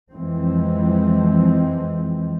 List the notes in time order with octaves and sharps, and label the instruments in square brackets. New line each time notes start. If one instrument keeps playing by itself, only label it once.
[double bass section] F2 E3 F3 G#3 C4